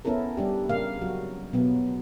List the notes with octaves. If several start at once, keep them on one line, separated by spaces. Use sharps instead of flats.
B3 C#4 E4 A4 A#4
G3 D4 G4
C#3 A#3 F5
F#3 F#4
B2 F#3 B3